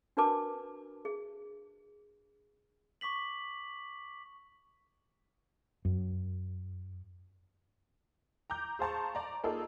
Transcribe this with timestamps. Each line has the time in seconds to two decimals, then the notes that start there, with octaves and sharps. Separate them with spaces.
0.17 D4 F#4 A#4 B4 A5 D6
1.05 G#4
3.01 C#6 D6 B6 F#7
5.85 F#2
8.50 A#5 D6 G6
8.79 G#4 C5 F5 A5 A#5 C#6
9.15 D5 A#5
9.44 A#3 D#4 F4 G#4 A4